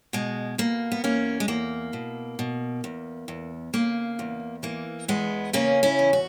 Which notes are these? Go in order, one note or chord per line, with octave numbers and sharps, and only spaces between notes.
B2 G#3
B2 A#3
B3
E2 A#3 C#4
G#3
E2 A#3
B2
B2
E2
E2
C#3 A#3
E2
E3 A#3
E2 G#3 B3
C#3 A#3 C#4
C#4 E4
E2
F#4